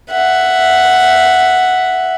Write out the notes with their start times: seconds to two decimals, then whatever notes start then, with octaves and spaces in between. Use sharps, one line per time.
0.11 E5 F#5